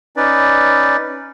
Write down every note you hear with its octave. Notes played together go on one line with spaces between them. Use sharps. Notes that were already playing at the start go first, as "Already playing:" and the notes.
C#4 D#4 B4 D5